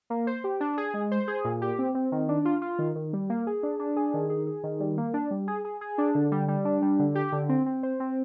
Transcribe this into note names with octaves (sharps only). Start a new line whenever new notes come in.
A#3
C5
G4
D4
G#4
G#3
C5
G#4
A#2
G4
C4
C4
D#3
D4
F4
F4
D#3
D#3
G3
A#3
G#4
D4
D4
G#4
D#3
G#4
G#4
D#3
G3
A#3
D4
G3
G#4
G#4
G#4
D4
D3
G3
G3
D4
G3
D3
G4
D3
C4
C4
C5
C4